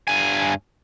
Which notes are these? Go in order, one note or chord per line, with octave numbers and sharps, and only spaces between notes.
G2 G#5